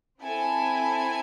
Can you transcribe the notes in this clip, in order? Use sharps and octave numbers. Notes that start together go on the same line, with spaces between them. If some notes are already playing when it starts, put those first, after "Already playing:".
C4 E4 A4 G#5